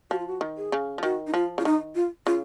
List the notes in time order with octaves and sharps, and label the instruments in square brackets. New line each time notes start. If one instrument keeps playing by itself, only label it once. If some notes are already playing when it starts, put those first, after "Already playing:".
[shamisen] F3 [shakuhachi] F#4
[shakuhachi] F4
F#4
[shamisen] D#3
[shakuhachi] G#4
[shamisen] C#3
F3
[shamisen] D#3 [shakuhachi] F#4
[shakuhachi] D#4
[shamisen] F3 [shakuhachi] F4
[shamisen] C#3 [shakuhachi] F4
[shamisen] D#3 [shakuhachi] D#4
[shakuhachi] F4
[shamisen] C#3 [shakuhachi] F4